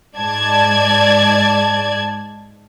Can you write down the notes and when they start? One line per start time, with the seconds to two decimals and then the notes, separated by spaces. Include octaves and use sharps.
0.18 G#2 D5 A5 G#6